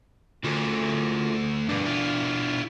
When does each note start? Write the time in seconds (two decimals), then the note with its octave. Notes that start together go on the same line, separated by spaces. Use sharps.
0.44 D2 F4 F#4 A4
1.69 G2 B2 D4
1.85 E4 F4